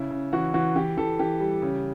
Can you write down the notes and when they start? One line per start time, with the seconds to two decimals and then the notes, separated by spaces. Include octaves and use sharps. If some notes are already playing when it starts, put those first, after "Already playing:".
Already playing: C#3 E4
0.11 C#3
0.33 E3 F#4
0.54 E3 F#4
0.76 E3 G4
0.97 E3 A4
1.19 E3 G4
1.40 G3
1.62 C#3